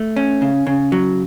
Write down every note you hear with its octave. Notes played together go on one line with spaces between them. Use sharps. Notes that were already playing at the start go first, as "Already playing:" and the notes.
Already playing: A3
C#4
C#3
C#3
F#3